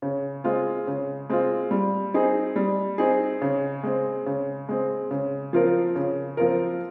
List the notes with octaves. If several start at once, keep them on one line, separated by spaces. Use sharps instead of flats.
C#3
G#3 C4 F4
C#3
G#3 C4 F4
G3
C4 D#4 G#4
G3
C4 D#4 G#4
C#3
G#3 C4
C#3
G#3 C4
C#3
F3 C4 F4 A#4
C#3
F3 C4 F4 A#4